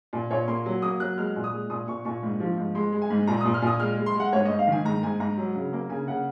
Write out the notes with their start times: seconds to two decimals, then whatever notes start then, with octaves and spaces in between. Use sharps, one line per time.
0.13 A#2
0.31 A#2 C#5
0.48 A#3 C6
0.66 F#3
0.82 A#3 D#6
1.00 F#3 F#6
1.18 G#3 F6
1.36 A#2
1.44 D#6
1.53 G#3
1.70 A#2 D#6
1.88 A#2 C#6
2.05 A#2 C#6
2.23 G#2
2.40 F3
2.58 G#2
2.75 G#3 C6
2.93 G#3
3.02 G#5
3.10 G#2
3.27 A#2 A#5
3.41 A#2 D#6
3.54 F6
3.62 A#2 D#6
3.80 G#3 F6
3.97 G#3
4.06 C6
4.15 G#3 F#5
4.33 G#2 C#5
4.46 G#2 D#5
4.59 F5
4.68 D#3 G#5
4.85 G#2 A#5
5.03 G#2 G#5
5.20 G#2 A#5
5.38 F#3
5.55 C#3
5.73 A#3
5.89 C#3 G#5
6.07 C#3 F#5